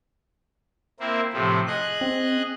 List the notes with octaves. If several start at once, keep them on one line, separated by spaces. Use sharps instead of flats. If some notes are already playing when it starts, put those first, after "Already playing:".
A#3 C4 E4
A2 C3 F3
G#4 D#5 F#6
C4